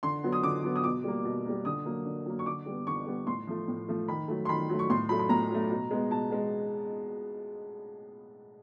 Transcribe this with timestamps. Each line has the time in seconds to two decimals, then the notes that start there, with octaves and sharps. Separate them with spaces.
0.03 D3 C6
0.23 F#3 B3
0.32 D#6
0.43 D3 D6
0.64 F#3 B3
0.76 D#6
0.84 B2 D6
1.04 G3 A#3
1.25 B2
1.45 G3 A#3
1.65 D3 D#6
1.86 F#3 A#3
2.06 D3
2.26 F#3 A#3
2.39 C#6
2.46 D3 D6
2.66 G3 B3
2.87 D3 C#6
3.06 G3 B3
3.27 A2 C6
3.47 F3 A3
3.68 A2
3.88 F3 A3
4.08 D#3 B5
4.28 F#3 A3
4.45 C6
4.48 D#3 B5
4.69 F#3 A3
4.79 C#6
4.89 A2 C6
5.09 F#3 A3 B5
5.19 B5
5.29 A2 A#5
5.50 F#3 A3
5.70 B2
5.91 G#3 B3
6.10 B2 A5
6.30 G#3 B3